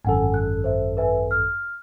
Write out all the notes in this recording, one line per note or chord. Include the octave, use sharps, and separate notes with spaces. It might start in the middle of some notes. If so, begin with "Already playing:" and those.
G#1 F#2 A4 F#5 G#5
F#6
C5 E5
B4 E5 G#5
F6